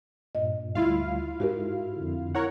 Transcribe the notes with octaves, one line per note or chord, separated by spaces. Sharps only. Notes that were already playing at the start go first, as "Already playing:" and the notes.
G2 A#2 D#5
D2 G3 E4 F4 F5
G#2 F#4 G4 A#4
F2 D3
E4 A#4 C#5 F#5